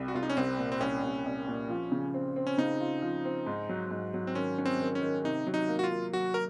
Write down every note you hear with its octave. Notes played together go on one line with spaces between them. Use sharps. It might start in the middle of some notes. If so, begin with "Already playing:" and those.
Already playing: C2
F#4
C2 F4
D#4
C#4
C2 C4
A#2
C4
C2 C#4
C2
C2
A#2
F3
C#3
C4
C4
C#4
C#3 D#4
F4
F3
C4
G#2
F#3
G#2
F#3
C4
D#3 C#4
C#4
C4
D#3
C#4
D#3
C3 D#4
F#3
D#4
A#3
F#4
F4
A#3
F#3 F#4
A#4